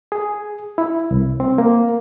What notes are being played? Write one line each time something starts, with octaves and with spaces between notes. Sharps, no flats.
G#4
E4
C2
C4
A#3